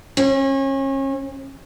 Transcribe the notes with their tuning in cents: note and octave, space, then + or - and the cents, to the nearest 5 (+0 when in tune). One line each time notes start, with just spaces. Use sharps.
C#4 -35